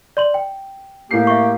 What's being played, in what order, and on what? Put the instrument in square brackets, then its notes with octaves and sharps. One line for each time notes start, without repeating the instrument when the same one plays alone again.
[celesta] D5 C6 F#7
G5
[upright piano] A2 C7 [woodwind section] A#3 G4
[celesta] E5 C#6